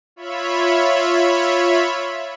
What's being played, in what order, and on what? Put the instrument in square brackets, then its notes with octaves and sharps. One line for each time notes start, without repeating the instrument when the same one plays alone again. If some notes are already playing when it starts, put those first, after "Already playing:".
[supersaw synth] F4 C#5 E5 B5